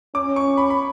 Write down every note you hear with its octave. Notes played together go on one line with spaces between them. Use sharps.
C#4 D6
C#6
B5
B5